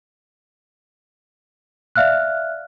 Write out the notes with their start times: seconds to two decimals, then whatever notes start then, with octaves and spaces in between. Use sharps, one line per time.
1.96 D5 E5 F5 F6 F#6